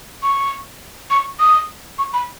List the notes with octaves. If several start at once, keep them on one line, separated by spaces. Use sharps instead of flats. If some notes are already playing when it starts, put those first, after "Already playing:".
C#6
C#6
D#6
C#6
B5